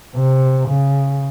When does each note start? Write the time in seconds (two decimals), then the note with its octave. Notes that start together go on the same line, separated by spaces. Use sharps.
0.16 C3
0.69 C#3